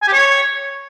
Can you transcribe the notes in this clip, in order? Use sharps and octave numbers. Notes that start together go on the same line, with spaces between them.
G#5
G4
C#5